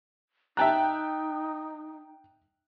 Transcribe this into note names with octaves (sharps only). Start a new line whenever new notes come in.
D#4 E5 G5 A5 A#5 F#6